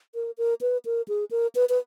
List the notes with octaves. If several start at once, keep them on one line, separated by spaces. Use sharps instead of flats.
A#4
A#4
B4
A#4
G#4
A#4
B4
B4